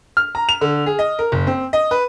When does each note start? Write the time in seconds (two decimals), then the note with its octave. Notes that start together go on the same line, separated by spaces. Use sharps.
0.17 F6
0.35 A#5
0.49 F7
0.61 D3
0.86 G#4
0.99 D#5
1.19 A#4
1.32 F#1
1.47 C4
1.73 D#5
1.91 B4